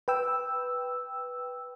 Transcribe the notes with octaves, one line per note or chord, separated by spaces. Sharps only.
B4 G5 E6